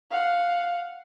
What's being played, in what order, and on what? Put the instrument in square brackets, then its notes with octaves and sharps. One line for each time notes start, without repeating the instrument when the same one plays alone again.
[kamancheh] F5 F#5